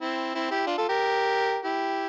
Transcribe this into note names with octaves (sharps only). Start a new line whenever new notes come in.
C4 E4
C4 E4
E4 G4
D4 F4
F4 A4
G4 A#4
E4 G4